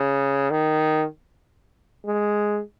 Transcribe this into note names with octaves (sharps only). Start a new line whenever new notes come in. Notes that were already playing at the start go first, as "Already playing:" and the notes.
Already playing: C#3
D#3
G#3